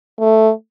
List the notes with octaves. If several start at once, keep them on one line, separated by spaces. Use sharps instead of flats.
A3